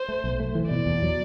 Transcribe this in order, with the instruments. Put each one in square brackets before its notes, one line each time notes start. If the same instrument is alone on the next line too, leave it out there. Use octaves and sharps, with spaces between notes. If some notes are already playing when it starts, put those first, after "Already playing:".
Already playing: [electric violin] C5
[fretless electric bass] A3
B1
A3
E3
[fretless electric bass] B2 [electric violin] D5
[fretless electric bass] E2
F#3